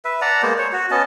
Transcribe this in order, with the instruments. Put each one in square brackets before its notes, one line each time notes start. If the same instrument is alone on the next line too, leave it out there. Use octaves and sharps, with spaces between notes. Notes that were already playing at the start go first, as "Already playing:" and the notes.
[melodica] B4 E5
D5 F#5 A5 A#5
G#3 A#3 B3 C5
C5 C#5
F#4
B3 C#4 D#5 A5